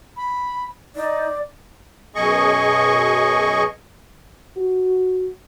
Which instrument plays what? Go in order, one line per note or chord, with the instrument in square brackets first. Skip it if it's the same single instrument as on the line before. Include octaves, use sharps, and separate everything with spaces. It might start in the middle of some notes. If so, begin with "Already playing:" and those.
[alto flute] B5
[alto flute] D#4 [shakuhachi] D5
[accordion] F#2 B2 G#4 D#5 C#6
[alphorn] F#4